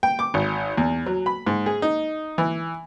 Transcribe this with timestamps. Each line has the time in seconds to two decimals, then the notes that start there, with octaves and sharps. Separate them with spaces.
0.03 G5
0.19 D6
0.34 G#1
0.78 E2
1.06 F#3
1.26 B5
1.47 G#2
1.66 G#4
1.82 D#4
2.38 E3